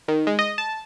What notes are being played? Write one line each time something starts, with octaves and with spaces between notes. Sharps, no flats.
D#3
G#3
D#5
A5